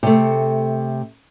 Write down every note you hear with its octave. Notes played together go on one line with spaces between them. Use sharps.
C3 A3